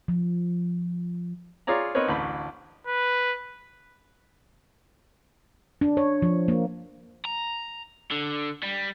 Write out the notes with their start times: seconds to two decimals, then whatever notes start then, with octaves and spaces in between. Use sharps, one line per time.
0.08 F3
1.67 F4 G#4 C#5 D5 A#5
1.95 B3 C4 D#4 A#4 B4 C#5
2.08 A1 D2 B5
2.87 B4
5.81 D4
5.97 C#5
6.22 F3
6.48 A#3
7.25 A#5
8.12 D3
8.63 G3